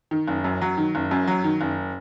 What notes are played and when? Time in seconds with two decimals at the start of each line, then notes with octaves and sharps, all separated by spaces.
0.11 D#3
0.28 F#1
0.44 F#2
0.61 F#3
0.78 D#3
0.95 F#1
1.11 F#2
1.27 F#3
1.44 D#3
1.61 F#1